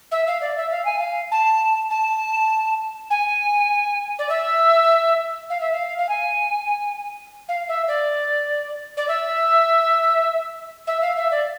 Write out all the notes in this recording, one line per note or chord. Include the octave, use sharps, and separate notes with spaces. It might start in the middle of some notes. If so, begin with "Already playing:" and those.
E5
F5
D5
E5
F5
G#5
F5
A5
A5
G#5
D5
E5
F5
E5
F5
F5
G#5
F5
E5
D5
D5
E5
E5
F5
E5
D5